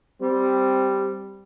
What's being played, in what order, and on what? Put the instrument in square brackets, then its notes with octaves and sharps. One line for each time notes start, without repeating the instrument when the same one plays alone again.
[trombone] G3 [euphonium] C4